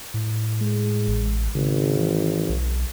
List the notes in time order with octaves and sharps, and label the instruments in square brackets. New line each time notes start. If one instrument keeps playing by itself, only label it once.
[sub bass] A2
[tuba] G#3
[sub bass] A1
[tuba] G#1 [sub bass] C#3
[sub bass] E3
B1